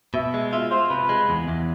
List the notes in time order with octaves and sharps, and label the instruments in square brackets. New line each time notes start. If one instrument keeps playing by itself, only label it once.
[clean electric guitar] B2 [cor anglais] E5
[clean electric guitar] G#3
[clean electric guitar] F4 [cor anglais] E5
[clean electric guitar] F4 [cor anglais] C5
[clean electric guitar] C3 [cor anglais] B4
[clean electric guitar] G#3
E2
E2